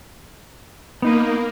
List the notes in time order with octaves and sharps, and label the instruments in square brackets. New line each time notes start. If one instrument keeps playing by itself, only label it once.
[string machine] A#3 [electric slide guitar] B3 D#4 B4